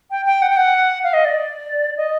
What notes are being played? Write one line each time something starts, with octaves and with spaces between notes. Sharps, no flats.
G5
G5
F#5
G5
F#5
F5
D#5
D5
D#5